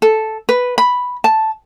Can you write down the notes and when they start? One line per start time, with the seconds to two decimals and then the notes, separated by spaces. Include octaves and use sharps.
0.02 A4
0.49 B4
0.78 B5
1.24 A5